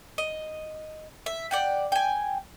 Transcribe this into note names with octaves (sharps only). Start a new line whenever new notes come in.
D#5
E5
D5 F#5 G5
G5 G#5